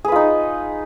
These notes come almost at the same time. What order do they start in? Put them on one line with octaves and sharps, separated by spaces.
G#4 B4 F4 D#4